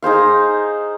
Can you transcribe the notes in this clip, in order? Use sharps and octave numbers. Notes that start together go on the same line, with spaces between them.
D#4 G#4 C5 F5